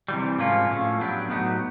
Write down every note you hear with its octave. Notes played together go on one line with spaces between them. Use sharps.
C3 E3 G3
G#2 F3 A#3 C#4 F4
A2 F3 A3 C#4
F#3 B3 D4 G4
A2 F#3 B3 D#4 F#4